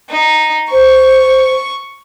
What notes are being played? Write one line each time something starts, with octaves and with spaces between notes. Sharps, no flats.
D#4
C5 C#6